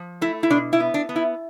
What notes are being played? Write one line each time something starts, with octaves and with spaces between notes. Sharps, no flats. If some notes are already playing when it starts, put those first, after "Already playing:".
Already playing: F3
A3 E4
E4
B2 D4
E4
B3
D4
B3
E4